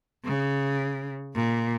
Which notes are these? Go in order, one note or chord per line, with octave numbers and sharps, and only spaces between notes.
C#3
A#2